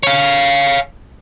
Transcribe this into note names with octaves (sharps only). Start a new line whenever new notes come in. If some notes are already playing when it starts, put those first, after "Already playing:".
C#5 F5